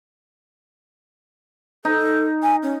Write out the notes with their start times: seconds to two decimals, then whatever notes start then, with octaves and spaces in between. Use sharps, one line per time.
1.85 D#4 A4
2.43 G#5
2.63 C#4